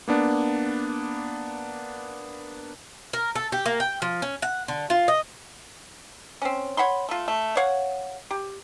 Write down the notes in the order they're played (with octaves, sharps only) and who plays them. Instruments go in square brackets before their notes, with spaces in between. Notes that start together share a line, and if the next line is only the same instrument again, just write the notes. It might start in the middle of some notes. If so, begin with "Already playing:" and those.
[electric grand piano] A#3 B3 D4
[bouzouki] A#4
A4
G4
A#3
G5
F3
C#4
F#5
D3
F4
D#5
[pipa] C4 C#4
C#5 F#5 B5 C6
A3 F4
A3
C#5 F5 F#5
G4